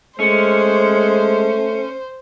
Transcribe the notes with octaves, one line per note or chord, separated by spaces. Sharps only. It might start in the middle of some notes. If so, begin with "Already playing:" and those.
G#3 A3 C#4 C5